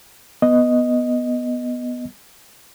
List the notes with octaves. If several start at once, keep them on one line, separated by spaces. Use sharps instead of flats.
B3 D#5